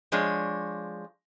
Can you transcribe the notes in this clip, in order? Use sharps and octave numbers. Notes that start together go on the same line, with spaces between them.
F3 G#3 D4 C#5